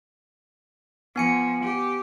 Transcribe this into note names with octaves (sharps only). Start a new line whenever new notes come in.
F3 B3 G#5 C#7
G4